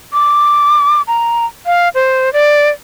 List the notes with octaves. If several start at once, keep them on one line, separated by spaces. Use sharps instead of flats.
D6
A#5
F5
C5
D5